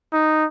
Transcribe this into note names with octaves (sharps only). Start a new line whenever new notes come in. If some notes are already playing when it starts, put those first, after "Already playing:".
D#4